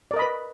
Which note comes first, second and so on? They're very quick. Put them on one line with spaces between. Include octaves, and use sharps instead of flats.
D5 A#4 D#5 B5 B4